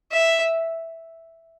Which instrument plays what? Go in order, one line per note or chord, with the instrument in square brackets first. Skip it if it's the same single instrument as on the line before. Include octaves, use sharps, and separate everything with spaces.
[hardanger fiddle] E5